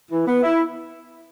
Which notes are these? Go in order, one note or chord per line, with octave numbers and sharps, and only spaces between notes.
E3
B3
E4